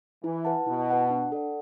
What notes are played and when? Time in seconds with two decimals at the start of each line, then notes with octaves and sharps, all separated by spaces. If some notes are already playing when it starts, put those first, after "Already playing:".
0.23 E3 E4
0.45 B4 F#5 A5
0.67 B2 E4
0.88 B4 F#5 A5
1.10 D4
1.32 A4 D5 F#5